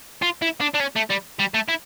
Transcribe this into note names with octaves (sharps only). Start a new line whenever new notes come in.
F4
E4
D4
D4
C#4
A3
G3
G3
A3
E4